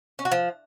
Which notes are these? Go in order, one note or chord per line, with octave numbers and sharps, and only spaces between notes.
C#4
F#4
F3